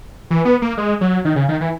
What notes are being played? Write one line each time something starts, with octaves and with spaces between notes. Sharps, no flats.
E3
B3
A#3
G#3
F#3
D#3
C#3
D#3
E3